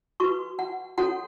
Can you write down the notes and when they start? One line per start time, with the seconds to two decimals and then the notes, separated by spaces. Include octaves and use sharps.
0.20 F#4 B4 C#6
0.59 F#5
0.98 C#4 F#4 A4 C#5 F#5